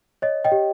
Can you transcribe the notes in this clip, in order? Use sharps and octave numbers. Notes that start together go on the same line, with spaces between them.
C#5 D#5
D#5 G5
G4